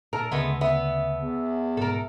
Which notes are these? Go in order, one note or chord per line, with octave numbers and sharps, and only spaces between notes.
A#2 A4 A#4 A5
D2 C#3 G#3 A3 B3
B3 E5
E2
A1 G#2 B2 A4 A#4